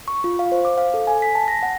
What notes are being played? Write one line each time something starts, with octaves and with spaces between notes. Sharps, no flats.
C#6
F4
F5
C5
D6
F5
A4
G#5
B6
A5
A#6
F#5